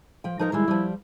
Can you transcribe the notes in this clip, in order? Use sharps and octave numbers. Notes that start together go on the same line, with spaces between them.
F3 G5
F3 D#4 A#4 A#5
D#3 G3 G#3 E4
F3 G3